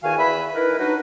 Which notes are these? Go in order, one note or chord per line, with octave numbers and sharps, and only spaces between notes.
E2 D#3 F#4 F5 G#5
E2 B4 E5 B5
D#4 E4 A#4 B4
F#3 D4 D#4 F#4 A#4 B4